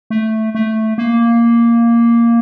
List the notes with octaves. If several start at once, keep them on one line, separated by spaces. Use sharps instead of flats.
A3
A3
A#3